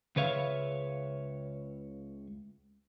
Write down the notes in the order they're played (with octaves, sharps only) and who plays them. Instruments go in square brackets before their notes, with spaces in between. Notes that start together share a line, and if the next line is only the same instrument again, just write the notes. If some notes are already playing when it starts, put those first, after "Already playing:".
[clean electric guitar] C#2 C#3 B4 C#5 E5 F5